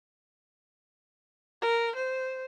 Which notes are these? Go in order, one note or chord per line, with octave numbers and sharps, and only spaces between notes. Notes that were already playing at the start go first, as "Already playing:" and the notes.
A#4
C5